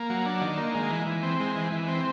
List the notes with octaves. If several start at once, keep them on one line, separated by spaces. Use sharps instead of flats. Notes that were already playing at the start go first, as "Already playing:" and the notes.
Already playing: A#3
F#3
D4
D#3
A#3
G#3
E3
E3
C4
G#3
E3
E3
C4